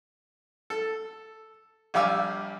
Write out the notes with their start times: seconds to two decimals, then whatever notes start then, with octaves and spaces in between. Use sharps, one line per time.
0.70 A4
1.94 A#1 G3 F5 G#5 D6 E6